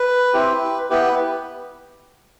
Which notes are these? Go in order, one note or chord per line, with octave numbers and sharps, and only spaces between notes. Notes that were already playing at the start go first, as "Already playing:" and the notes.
Already playing: B4
C4 E4 G4
B3 E4 G4 B4